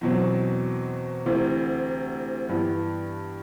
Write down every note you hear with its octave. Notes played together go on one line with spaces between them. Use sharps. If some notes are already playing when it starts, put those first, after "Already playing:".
E2 B2 F#3 C4
D2 C3 E3
G2 E3 B3